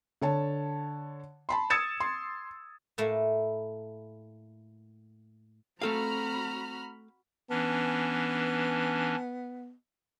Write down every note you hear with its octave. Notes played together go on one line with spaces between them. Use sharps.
D3 C#5 A5
A5 B5 C6
D#6 E6 G#6 A6 C#7 E7
C6
A2 A3 A#3 E4
A3 C4 F#4 A4 F5 A#5 B5 F6
E3 B3 C#4 D4